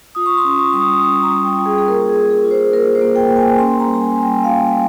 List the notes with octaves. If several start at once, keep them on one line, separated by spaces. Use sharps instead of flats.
F4 D#6
C#6
C6
C#4
C#6
G3 C#6
D#6
C#4 C#6
A#5
G3
G5
F4
G#4
G#4
A#3 A#4
G#4
F4
G#4
F4
C5
A#3 A#4
C5
A#3
G5
A#3
G#5
C#4 C6
A#5
G3
A#5
G#5
G3
G5
F4 F5
G3